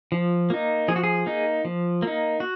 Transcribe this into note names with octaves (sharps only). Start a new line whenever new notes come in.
F3
A#3 D#4
F3 G#4
F#4
G#4
A#3 D#4
F3
A#3 D#4
F#4